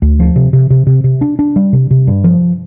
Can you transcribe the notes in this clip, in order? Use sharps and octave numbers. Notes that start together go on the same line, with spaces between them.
D2
F3
C3
C3
C3
C3
C3
D4
D4
G3
C3
C3
G2
F3